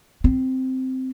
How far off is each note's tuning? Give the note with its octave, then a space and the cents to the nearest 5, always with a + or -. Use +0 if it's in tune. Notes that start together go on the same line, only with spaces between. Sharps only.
C4 -10